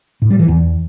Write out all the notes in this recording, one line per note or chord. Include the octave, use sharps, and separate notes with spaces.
A2
G3
E3
E2